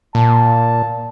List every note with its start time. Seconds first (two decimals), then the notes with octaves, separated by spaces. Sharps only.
0.15 A#2 A5